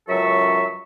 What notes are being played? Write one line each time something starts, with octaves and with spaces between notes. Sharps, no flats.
C#2 F#2 F#3 A4 E5 C#6